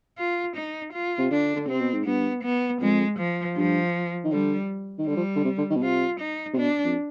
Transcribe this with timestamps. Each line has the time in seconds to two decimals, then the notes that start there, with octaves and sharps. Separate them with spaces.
0.18 F4
0.56 D#4
0.93 F4
1.18 C3
1.31 D3 D4
1.55 D3
1.68 C3 C4
1.81 B2
1.93 G#2
2.06 G2 B3
2.43 B3
2.81 F2 G#3
3.19 F3
3.57 G2 F3
4.24 D#3
4.32 D3 G3
4.98 D#3
5.07 D3 G3
5.17 F3
5.36 D3
5.45 C3
5.58 D3
5.70 D#3
5.77 B2
5.82 C3 F4
6.20 D#4
6.54 C3
6.58 B2 D4
6.84 F2